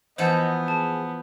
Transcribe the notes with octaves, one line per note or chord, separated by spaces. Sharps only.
E3 F3 B3 C5 D#5 F#5 A5
G#4 A5